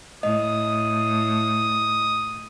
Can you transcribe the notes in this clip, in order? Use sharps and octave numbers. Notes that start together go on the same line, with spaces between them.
A2 D#5 D#6